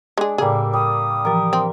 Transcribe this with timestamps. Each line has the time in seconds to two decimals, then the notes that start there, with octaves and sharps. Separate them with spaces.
0.18 G#3 D4 G#4
0.38 A2 C#3 G3 A#3 G#4 E6
0.73 G3 D#6
1.25 E3 F3 G4 A#4
1.53 C4